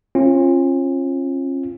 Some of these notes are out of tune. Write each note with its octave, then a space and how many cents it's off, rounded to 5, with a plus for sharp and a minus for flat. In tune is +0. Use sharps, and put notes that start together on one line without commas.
C#4 -40 F4 -15